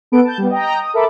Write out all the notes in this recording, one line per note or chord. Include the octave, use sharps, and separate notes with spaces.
B3 A4 B4 D7
A5 G6
G3 B3
D#5 G5 A#5
D#6
A4 A#4 E5 B5 D6